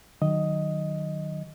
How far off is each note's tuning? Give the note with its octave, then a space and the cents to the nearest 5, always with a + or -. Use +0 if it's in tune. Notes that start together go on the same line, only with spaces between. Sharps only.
D#3 -25 F#3 +0 D#5 +5